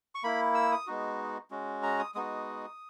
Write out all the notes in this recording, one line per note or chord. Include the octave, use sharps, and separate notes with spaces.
C#6
A#3 E4 B5
E6
D#6
G#3 B3 D#4 F#4
G#3 C#4 F#4
A#5
D#6
G#3 B3 D#4 F#4 D#6